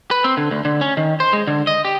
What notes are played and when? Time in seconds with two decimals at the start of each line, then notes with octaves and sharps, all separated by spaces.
0.11 B4
0.24 C4
0.37 D3
0.51 D2
0.65 D3
0.81 C#4
0.97 D#3
1.20 C5
1.33 G#3
1.47 D3
1.67 D#5
1.85 G4